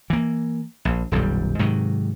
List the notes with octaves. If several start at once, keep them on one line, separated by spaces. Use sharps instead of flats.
E3 A#3
A#1
D#1 B1 F#2 G3
G#2 C3 D#3 F#3